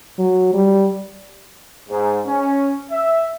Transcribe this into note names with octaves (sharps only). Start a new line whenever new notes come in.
F#3
G3
G#2
C#4
E5